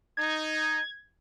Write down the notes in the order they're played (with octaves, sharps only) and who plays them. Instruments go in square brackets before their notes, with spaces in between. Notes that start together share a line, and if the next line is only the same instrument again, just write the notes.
[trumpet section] D#4 [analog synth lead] G#6